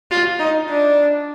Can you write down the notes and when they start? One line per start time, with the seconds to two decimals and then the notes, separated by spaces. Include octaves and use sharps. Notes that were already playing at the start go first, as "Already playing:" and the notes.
0.11 F4
0.39 D#4
0.69 D4